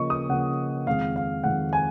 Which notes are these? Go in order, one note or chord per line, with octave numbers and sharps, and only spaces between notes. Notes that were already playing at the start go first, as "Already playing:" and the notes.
Already playing: C#3 F3 A#3 D#5 C#6
D#6
C#3 F3 A#3 F#5
F2 D#3 G#3 F5
F5
F2 D#3 G#3 F#5
G#5